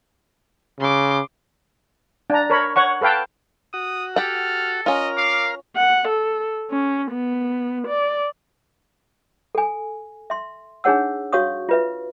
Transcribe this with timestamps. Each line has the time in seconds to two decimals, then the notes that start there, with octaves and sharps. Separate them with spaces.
0.80 C#3 C6 D6
2.30 D4 A#5
2.50 A#4 C#5 B5
2.76 C#5 F#5 C#6
3.01 A4 B4 F5 G5 A5
3.74 F#4 D#6
4.16 G4 A4 F#5 F6
4.86 C#4 F4 A#4 D#5 F6
5.17 F5 D6
5.77 F#5
6.08 A4
6.70 C#4
7.11 B3
7.87 D5
9.55 A4 G#5
10.30 E5 C6
10.84 D4 D#4 G#4 C#5 F#5 E6
11.33 F#4 C#5 F5 C#6 D#6
11.69 F4 B4 E5